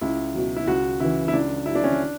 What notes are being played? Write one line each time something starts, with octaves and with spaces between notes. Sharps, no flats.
C#2 E4
B2 F#3
E4
C#2 F#4
C#3 E3 E4
E4
C#2 D4
C#3 F#3 E4
D4
C#4
D4